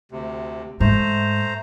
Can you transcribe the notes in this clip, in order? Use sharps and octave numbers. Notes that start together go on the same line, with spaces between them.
D2 C3
G#2 A3 C5 A#5